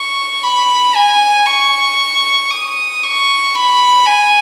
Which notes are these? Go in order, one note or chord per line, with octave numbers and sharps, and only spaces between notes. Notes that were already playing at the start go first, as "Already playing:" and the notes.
Already playing: C#6
B5
G#5
C#6
D#6
C#6
B5
G#5